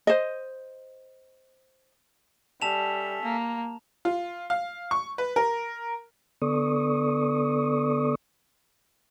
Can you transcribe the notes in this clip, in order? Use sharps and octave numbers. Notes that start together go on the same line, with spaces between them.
C5 D#5
G3 C#4 A4 E5 A5 E7 F7
A#3
F4
F5
C#6
B4
A#4
D3 B3 A4 D5 C#6 D#6